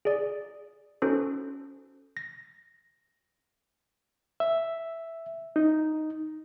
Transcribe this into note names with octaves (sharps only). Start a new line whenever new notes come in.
G#4 D5
C#4 D#4 F#4 A4 C5
A#6
E5
D#4